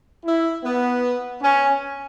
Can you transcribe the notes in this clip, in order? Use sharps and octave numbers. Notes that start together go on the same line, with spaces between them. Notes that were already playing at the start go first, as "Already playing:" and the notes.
E4
B3
C#4